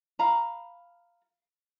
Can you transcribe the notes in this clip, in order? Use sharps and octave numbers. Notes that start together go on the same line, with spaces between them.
F5 A#5 B5